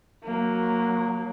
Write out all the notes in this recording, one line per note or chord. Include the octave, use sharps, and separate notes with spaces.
F#3 A#3